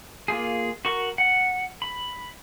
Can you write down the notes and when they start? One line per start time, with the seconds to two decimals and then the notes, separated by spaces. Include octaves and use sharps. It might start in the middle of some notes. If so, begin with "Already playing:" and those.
0.28 A#3 F4 G#4
0.85 F#4 A#4 C#6
1.18 F#5
1.82 B5